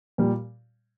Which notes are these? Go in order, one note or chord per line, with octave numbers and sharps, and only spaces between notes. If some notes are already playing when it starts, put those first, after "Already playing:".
A#2 G3